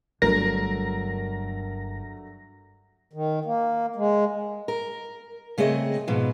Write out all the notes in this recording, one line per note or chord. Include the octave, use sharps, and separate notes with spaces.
G1 G2 F#3 A3 A#4 A#6
D#3
A#3
G#3
A#4
C#3 A3 C4 G#4 D#5
G#2 B2 F3